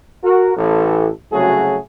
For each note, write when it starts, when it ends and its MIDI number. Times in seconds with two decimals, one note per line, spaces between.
0.23 0.53 66
0.23 0.53 70
0.56 1.08 33
0.56 1.08 52
0.56 1.08 69
1.32 1.76 36
1.32 1.76 49
1.32 1.76 54
1.32 1.76 57
1.32 1.76 66
1.32 1.76 68